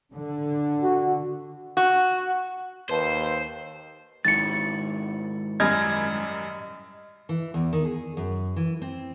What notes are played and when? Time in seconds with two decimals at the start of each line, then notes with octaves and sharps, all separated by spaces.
0.15 D3
0.82 F#4
1.77 F#4
2.89 D#2 B4 C5 A5 B5
4.25 G#2 D#3 E4 A6 C#7
5.60 F#2 G3 D#5 F6 G#6
7.29 E3
7.54 E2
7.73 D#3
7.85 G#4
8.17 F#2
8.56 E3
8.82 C4